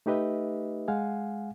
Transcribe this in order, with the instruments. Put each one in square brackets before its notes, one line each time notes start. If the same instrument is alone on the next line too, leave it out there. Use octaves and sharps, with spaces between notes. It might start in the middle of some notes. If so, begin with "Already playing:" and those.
[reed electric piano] A3 D#4 G4 B4 D#5 E5
G#3 F5 F#5 G#5